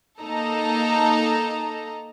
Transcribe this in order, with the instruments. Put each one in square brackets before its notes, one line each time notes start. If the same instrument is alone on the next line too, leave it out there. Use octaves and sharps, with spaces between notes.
[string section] A#3 D#4 A4 D#5 A5 A#5